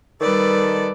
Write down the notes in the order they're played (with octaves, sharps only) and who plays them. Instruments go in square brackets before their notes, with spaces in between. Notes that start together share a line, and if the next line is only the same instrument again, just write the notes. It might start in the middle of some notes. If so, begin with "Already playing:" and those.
[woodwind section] D#3 A4 [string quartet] G3 B4 D5